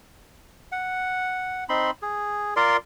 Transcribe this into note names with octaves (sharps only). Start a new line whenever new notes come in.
F#5
C4 D#4 B5 C6
G#4
F4 A#4 D5 C6